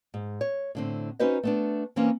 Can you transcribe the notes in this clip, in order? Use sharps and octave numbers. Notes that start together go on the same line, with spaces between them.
G#2
C#5
A2 D3 C4
C#4 D#4 F#4 B4 C5 D#5
A3 B3 D4
E3 A#3 C4 C#4